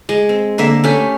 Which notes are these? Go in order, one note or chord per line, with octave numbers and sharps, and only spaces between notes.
G#3
C4
D3 A#3 E5
A3 C#4 G4